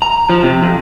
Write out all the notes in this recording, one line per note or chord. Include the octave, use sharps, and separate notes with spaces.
A#5
F3
C3
F2